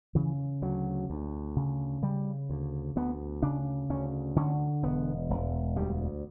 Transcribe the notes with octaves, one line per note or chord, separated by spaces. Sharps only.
C#3 E3
D2 F#3
D2
C#3
C#3 G3
D2
D2 B3
C#3 D4
D2 C#4
D3 C#4
E1 B3
E1
D2 G3